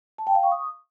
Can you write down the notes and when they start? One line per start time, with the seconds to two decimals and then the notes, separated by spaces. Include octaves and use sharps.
0.18 A5
0.27 G5
0.35 F5
0.43 C#6
0.52 D#6